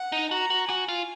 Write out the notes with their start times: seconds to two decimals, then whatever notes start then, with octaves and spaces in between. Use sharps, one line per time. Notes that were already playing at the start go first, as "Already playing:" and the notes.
Already playing: F#5
0.12 D#4
0.31 F#4 A#5
0.50 F#4
0.69 F#4 G#5
0.88 F4